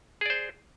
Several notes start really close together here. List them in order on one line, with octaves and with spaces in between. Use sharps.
G#4 D5 C5